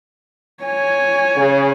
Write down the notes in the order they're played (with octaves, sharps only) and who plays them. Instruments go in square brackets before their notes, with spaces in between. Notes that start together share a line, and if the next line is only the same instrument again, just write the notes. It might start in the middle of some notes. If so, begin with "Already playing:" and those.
[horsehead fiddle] C#5 G#5
[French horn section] C#3